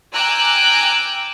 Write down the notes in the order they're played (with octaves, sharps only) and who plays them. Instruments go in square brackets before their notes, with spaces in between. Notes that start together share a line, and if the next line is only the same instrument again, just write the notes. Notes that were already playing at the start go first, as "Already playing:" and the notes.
[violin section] G5 G#5 A#5 D6 E6 F#6